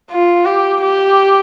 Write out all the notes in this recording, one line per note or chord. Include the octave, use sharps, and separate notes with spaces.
F4
G4
G4